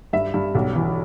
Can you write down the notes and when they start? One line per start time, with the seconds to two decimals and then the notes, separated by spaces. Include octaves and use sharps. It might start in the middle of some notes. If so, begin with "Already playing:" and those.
0.13 G2 E5
0.34 G2
0.55 B1
0.76 E3